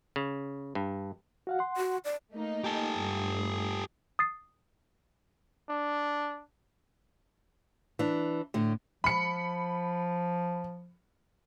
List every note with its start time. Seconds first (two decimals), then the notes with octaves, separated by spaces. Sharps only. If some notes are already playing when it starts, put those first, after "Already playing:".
0.16 C#3
0.75 G2
1.47 F#4 F5 F#5
1.59 F#5 C6
1.77 F#4
2.05 D5
2.32 A3 A#3 D#4
2.64 G4 A4
2.94 G2 A3
4.19 D#6 A6 C7
5.69 D4
7.99 E3 D4
8.54 A2 D3
9.04 F3 B5 C#7